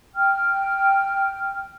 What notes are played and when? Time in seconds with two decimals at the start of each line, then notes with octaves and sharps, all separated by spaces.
0.16 G5 F6